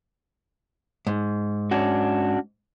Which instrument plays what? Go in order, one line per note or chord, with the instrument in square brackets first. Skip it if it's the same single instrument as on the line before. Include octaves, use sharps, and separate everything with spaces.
[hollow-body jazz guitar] G#2
[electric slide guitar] C#4 D4 F#4